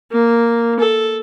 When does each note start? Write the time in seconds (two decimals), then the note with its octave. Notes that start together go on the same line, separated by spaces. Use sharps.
0.12 A#3
0.79 A4